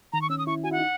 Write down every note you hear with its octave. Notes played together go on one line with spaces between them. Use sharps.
D#3 A#5
C#6
C#4 E6
D#6
E4 C#6
F#4 G#5
E4 F#5
D#4